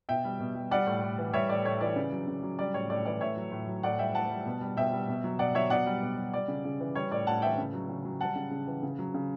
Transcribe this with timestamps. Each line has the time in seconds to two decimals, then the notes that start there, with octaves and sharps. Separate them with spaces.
0.09 B2 E5 G5
0.25 G3
0.40 B2
0.56 G3
0.71 G3 D5 F#5
0.87 A2
1.02 A2
1.18 E3
1.33 G3 C#5 E5
1.49 A2 D5
1.65 A2 C#5
1.81 E3 D5
1.96 C#3
2.12 F#3
2.27 C#3
2.43 F#3
2.59 G3 D5
2.74 A2 C#5
2.90 A2 D5
3.06 E3 D5
3.21 A2 C#5 E5
3.37 F#3
3.52 A2
3.67 F#3
3.83 A2 D5 F#5
3.99 G3 E5 G5
4.14 A2 F#5 A5
4.30 G3
4.46 B2
4.61 G3
4.77 B2 E5 G5
4.93 G3
5.08 B2
5.24 F#3
5.39 B2 D5 F#5
5.55 F#3 C#5 E5
5.70 B2 D5 F#5
5.86 G3
6.02 B2
6.18 G3
6.33 G3 D5
6.48 C#3
6.65 C#3
6.80 E3
6.95 G3 C#5
7.11 A2 D5
7.27 A2 F#5 A5
7.42 E3 E5 G5
7.58 C#3
7.74 F#3
7.89 C#3
8.05 F#3
8.21 G3 F#5 A5
8.35 C#3
8.51 C#3
8.67 E3
8.83 C#3
8.99 F#3
9.14 C#3